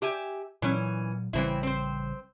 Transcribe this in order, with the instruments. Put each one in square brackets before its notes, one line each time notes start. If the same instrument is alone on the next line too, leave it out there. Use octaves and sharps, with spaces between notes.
[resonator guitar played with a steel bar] G4 E5 G#5
[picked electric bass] A#2 F#3 [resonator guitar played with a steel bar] E3 C#4
[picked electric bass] A1 C#3 G3 [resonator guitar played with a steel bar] E3 C4 E4
[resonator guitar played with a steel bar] C4 C5